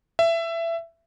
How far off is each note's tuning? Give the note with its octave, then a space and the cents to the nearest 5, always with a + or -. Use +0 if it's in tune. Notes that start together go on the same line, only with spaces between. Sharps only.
E5 +20